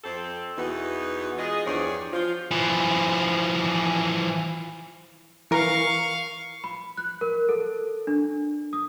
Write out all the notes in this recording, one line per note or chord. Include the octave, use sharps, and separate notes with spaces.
F2 C4 A4
E2 B2 E3 B3 D#4
G#3 F4 G#4 D#5
E2 G2 F3 G#4 C#5 D5
F3 F4
E3 F3
E3 A#4 F5 C#6
B5
F#6
A#4
A4
D4
D#6